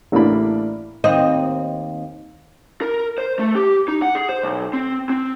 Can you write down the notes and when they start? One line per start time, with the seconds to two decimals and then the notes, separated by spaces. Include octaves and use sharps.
0.12 A1 A2 A#3 D4 D5 B5
1.04 D#2 C4 D#5
2.82 A#4
3.18 C5
3.39 A3
3.56 G4
3.88 D#4
4.02 F#5
4.15 G#4
4.29 C5
4.43 B1
4.73 C4
5.10 C4